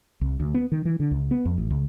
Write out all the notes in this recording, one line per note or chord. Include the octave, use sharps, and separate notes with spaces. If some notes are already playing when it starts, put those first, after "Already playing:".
C2
D2
B3
D#3
E3
D3
C#2
B3
F2
A1
C#2